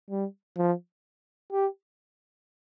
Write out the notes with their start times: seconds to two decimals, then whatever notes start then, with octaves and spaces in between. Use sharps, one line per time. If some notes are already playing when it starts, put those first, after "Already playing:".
0.10 G3
0.58 F3
1.52 G4